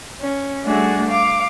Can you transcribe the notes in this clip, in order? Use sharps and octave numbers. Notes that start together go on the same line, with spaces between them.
C#4
G3 A3 D4 F#4 G#4
F5 D6